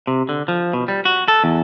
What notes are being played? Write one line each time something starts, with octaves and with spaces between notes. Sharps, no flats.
C3
D3
F3
B2
G3
F#4
A4
E2